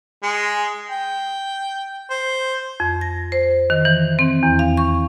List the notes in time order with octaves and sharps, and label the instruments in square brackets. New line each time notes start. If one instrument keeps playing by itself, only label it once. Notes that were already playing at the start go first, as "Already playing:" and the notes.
[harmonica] G#3
G5
C5
[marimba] F2
A#6
C5
D#3
E3
C4
E2
F5
C#6